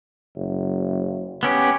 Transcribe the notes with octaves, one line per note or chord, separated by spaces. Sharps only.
F#1
B3 C#4 G4